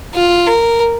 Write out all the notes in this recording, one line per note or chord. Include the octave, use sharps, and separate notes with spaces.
F4
A#4